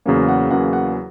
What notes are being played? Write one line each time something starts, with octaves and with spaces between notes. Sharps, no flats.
E2 C#3 F#3 A#3 C#4
F#5
E2 C#3 F#3 A#3 C#4 F#5
F#5